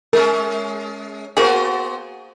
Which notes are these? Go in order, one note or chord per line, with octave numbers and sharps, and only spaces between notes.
G#3 C#4 A#4
A#3 B3 F#4 G#4 C5